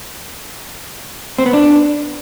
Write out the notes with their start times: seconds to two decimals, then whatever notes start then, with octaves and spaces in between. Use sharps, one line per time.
1.38 C4
1.46 B3
1.53 D4